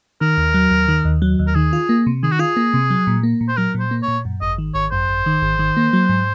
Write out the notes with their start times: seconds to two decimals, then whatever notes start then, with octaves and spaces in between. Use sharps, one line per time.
0.21 D#3 A#4
0.37 D#2
0.54 F#3
0.71 D#2
0.88 D#3
1.05 D#2
1.22 F#3
1.39 D#2
1.47 A#4
1.55 D#3 G#4
1.73 F4
1.89 A#3
2.07 C3
2.23 D#3 G#4
2.32 F#4
2.39 F4 G#4
2.57 A#3
2.74 C3
2.90 F#3
3.07 A#2
3.23 A#3
3.41 A#2
3.49 C5
3.57 F#3 A#4
3.75 A#2
3.80 C5
3.91 A#3
4.03 C#5
4.08 A#2
4.25 F#2
4.42 G#1 D#5
4.58 D#3
4.75 G#1 C#5
4.91 F#2 C5
5.08 G#1
5.26 D#3
5.42 G#1
5.59 D#3
5.77 A#3
5.93 F#3
6.09 G#2